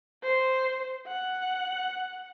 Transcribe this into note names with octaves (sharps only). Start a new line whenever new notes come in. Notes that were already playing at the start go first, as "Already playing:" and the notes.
C5
F#5